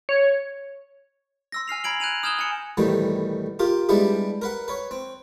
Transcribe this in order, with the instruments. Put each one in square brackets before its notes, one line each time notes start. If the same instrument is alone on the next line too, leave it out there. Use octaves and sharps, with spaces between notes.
[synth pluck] C#5
[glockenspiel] C6 E6 A#6
G#5 F6 C7 F7
A#5 B5 G#6 D7 F#7
F#6 G#6 D#7 F7
D#6 F6 G6 G#6 E7 G7
G#5 C#7
[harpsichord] B1 A2 D#3 E3 G3
F4 G4 A#4
G3 G#3 B3 D4 E4 G4
A#4 B4 F#5
B4 C#5
C4